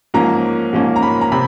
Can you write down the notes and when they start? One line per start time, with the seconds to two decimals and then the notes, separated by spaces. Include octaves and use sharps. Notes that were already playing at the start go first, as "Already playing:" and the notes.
0.14 G#2 F3 A#3 C#4 A#5
0.73 G#2 F3 A#3 C#4
0.96 A#5
1.03 B5
1.21 A#5
1.32 C3 B5